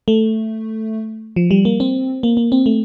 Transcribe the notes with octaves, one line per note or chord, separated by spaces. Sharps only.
A3
F3
G3
A#3
C4
A#3
A#3
C4
A3